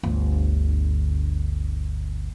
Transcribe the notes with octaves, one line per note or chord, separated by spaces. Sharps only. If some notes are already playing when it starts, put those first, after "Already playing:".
G1 D2